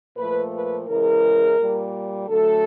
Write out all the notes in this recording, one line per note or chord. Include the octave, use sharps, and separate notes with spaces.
A#2 F3 A3 B4
B4
C#3 E3 G#3 A#4
A#2 G3
D3 F#3 A3 A4